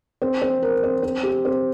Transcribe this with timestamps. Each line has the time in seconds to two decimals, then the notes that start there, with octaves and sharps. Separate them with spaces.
0.22 C4
0.42 C4
0.62 A#4
0.84 C4
1.03 C4
1.23 G4
1.45 C4